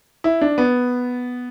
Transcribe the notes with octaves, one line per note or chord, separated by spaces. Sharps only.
E4
D4
B3